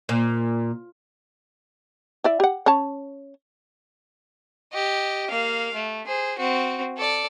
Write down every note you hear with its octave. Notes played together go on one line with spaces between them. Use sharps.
A#2
E4 D5 E5
G4 F#5
C#4 C#5 A5
G4 D#5
A#3 F5
A3
G#4 C5
C4 F#4
A4 D5